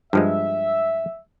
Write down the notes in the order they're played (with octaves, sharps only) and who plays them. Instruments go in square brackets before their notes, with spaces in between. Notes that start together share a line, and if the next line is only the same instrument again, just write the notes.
[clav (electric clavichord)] G2 F3 G#3 [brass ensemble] E5